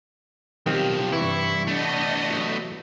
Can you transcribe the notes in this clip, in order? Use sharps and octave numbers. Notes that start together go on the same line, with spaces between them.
B1 D#3 F3 C4 G4 F5
G2 C3 E3 E4 C#6
A3 B3 D4 D#5
F#3 F#4